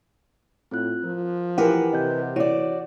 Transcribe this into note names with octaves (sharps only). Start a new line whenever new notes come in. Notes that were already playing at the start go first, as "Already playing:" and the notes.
A2 C4 F4 F#6
F3 A#4
E3 E4 G4 A#4 B4 F#5 G#5
C3 D#5 G6
E3 F#4 C#5 D5